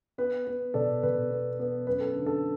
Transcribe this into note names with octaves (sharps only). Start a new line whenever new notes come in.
B3 B4
B3
B2 A4 D5
B2 B4
B3
B3
F#2 B4
A4
D3
A4